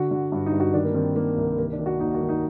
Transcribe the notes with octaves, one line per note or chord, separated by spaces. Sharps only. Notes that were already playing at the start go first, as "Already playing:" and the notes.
Already playing: D3 F#4
D3
G2
D#4
G2
F#4
D#3 D4
A#3
D#3 C4
D#3 A#3
C2
D#3 A#3
D4
D#3
F#4
D#2 D#4
F#4
D#3
D#4